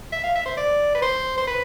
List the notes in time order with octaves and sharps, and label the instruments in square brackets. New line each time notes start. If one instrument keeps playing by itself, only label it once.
[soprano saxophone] E5
F5
E5
C5
D5
B4
C5
C5
B4